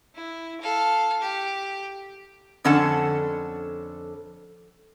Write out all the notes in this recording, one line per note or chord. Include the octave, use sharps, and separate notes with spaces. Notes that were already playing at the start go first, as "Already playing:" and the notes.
E4
A4 F5
G4
F2 D3 C#4 A4 F#5 A5